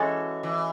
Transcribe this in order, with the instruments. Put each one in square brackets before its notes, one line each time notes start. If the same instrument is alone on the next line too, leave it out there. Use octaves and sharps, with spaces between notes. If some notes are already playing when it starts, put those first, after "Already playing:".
Already playing: [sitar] E3 [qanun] G#3 C#4 F#4 A4
[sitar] E3